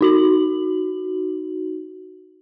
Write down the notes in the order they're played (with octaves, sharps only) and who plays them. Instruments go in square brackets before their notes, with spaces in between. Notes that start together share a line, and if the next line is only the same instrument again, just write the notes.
[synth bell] D#4 F#4 F#7